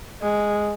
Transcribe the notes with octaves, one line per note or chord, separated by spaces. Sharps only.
G#3